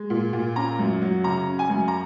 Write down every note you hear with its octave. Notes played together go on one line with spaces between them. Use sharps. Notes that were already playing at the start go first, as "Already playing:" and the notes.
Already playing: G#3
A#2
A#2
C#4 A#5
F#2
F#3
C#3 A#5
C#4
G#5
F#2
A#5